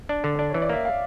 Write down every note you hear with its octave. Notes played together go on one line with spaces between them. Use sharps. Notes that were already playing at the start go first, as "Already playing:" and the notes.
D4
D3
D4 D5
C#5
E3
D5
A#3 E5
F5